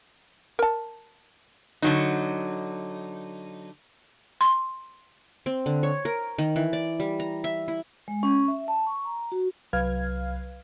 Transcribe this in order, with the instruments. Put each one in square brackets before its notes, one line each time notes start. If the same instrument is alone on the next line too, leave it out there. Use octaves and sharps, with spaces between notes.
[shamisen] A#4 A5
[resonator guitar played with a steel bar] D3 F#3 D#4
[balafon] C6
[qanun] C4
D3
C#5
A#4
D#3
E3
D5
G3
A#5
E5
E4
[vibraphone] G#3
C#4
E5
A5
C#6
A#5
F#4
[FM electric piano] C2 F#3 B4 F5 F6 G#6